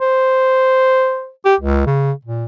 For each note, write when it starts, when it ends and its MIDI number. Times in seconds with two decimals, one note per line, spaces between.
0.01 1.30 72
1.45 1.55 67
1.60 1.86 37
1.87 2.12 49
2.25 2.46 46